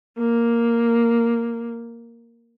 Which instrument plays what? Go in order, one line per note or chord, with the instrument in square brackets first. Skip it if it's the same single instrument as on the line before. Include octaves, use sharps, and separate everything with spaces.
[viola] A#3